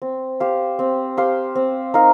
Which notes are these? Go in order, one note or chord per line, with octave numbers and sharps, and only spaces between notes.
C4
G4 C5 F5
C4
G4 C5 F5
C4
D#4 A#4 F5